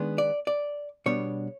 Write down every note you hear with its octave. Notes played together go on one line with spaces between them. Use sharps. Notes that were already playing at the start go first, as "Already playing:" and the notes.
Already playing: D#3 G#3 B3 D4
D5
D5
B2 G3 B3 D4 C#5